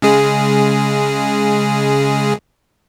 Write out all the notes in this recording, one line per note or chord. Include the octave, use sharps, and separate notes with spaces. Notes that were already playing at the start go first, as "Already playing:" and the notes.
C#3 G#3 G#4